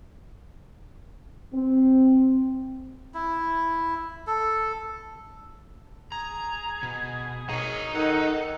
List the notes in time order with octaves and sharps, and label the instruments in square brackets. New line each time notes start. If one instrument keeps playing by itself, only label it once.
[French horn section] C4
[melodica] E4
A4
[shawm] G#4 [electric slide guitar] A#5
[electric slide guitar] B2
[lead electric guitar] D#4 [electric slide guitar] G#4 A#4 [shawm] C#5
[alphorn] D#3 [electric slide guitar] A4 [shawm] F#5